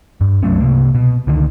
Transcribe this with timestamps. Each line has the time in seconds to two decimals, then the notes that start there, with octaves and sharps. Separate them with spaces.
0.21 G2
0.43 C#2 F#3 A3 C#4
0.61 C2 F#2 C3 A#3
0.95 B2
1.27 C#2 D3 D#3